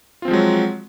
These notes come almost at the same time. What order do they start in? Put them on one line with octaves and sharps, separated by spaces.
F4 C4 F3 G#3 F#3